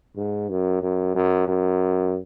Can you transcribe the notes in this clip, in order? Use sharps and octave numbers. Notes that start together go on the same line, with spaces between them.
G#2
F#2
F#2
F#2
F#2